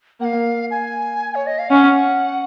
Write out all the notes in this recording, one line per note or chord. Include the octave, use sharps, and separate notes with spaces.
A#3 F5 F#5
G#5
C#5
D#5
F5
C#4 F#5